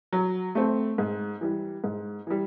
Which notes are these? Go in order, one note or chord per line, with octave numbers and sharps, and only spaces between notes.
F#3
A3 C4
G#2
E3 G3
G#2
E3 G3